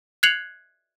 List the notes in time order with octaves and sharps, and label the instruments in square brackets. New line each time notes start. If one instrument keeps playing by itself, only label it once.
[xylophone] F#6 G#6 C7 C#7 F7 F#7